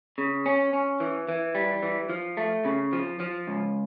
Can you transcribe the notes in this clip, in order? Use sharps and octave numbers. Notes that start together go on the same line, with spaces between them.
C#3
C#4
C#4
E3
E3
G3
E3
F3
A3
C#3
F3
F3
C#2